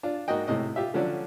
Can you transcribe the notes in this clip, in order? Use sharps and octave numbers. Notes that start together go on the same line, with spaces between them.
D4 F4
G#2 A#3 F#4 D#5 G5
A2 C3 D#5
F4 G4 E5
D3 F3 F#3 C#4 D4